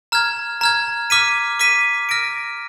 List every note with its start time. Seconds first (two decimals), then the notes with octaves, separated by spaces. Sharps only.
0.12 A#5 F6 G#6
0.61 A#5 F6 G#6
1.10 D6 F6 B6 D#7
1.59 D6 F6 B6 D#7
2.09 F6 A#6 D7